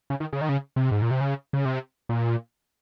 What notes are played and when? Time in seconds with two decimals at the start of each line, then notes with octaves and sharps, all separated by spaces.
0.10 C#3
0.20 D#3
0.33 C#3
0.41 D#3
0.49 C#3
0.76 C3
0.91 G#2
1.02 A#2
1.11 C3
1.21 C#3
1.53 C#3
1.65 C3
2.09 A#2